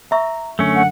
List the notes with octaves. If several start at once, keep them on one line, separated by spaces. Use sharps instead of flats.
E5 A#5 C#6 E6
F#2 D3 A3 C#4
F#5